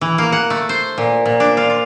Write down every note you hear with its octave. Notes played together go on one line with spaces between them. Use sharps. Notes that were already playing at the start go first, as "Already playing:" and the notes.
E3
A#3
F#5
A3
C5
A#2
A#2
D4
F4
F4